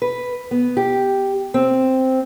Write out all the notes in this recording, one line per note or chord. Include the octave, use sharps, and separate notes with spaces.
B4
B3
G4
C4